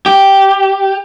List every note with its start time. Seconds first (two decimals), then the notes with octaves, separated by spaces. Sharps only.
0.06 G4